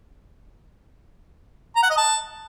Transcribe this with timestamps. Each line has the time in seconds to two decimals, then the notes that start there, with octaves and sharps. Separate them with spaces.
1.76 A#5
1.83 F#5
1.90 D#5
1.98 A5